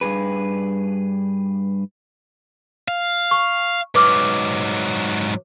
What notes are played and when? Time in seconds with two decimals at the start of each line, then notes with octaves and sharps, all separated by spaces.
0.01 G2 C3 G#4 B4
2.88 F5
3.31 C#6
3.95 G#2 F#3 B4 D6 F6